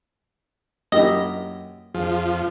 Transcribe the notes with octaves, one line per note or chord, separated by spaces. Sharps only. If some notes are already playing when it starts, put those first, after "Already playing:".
F#2 A#3 E4 G4 D#5 E6
F2 F3 G#4